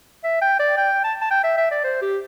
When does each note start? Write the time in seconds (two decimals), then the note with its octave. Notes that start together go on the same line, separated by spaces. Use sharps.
0.24 E5
0.42 G5
0.59 D5
0.77 G5
1.04 A5
1.21 A5
1.31 G5
1.44 E5
1.58 E5
1.71 D5
1.84 C5
2.02 G4